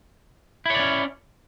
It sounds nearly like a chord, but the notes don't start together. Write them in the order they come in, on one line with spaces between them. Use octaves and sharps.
E4 C#5 D5 C#4